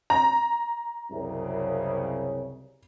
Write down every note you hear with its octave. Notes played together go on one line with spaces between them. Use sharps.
A#5
C2 F#2 C#3